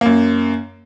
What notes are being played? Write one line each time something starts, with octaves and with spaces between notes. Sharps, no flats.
F#2 A#3